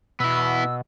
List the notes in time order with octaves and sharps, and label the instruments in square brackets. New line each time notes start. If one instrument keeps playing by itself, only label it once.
[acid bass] B2 [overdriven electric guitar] B3 E4 [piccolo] E6